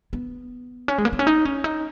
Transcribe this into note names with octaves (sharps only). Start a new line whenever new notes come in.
B3
C#4
G#3
A#3
B3
C#4
D#4
C#4
D#4